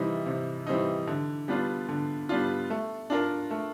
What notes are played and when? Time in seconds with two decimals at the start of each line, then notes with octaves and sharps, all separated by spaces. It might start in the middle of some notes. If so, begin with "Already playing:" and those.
Already playing: C3 E3 G3 C4 D#4
0.26 C3
0.67 E3 G3 C4 D#4
1.07 D3
1.48 G3 B3 D4 F4
1.89 D3
2.29 G3 B3 D4 F4
2.70 A3
3.10 D4 F4 A#4
3.51 A3